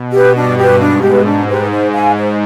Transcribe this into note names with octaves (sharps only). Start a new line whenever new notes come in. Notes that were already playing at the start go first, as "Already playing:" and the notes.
Already playing: B2
G4 B4
G2 D4
G4 B4
G#2 D4
G4 B4
G#2 D4
G4 B4
C5
F5 G#5
G#2 C5